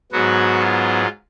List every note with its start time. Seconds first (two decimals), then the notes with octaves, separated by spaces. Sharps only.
0.12 G#2 F#3 B3 F#4
0.60 F4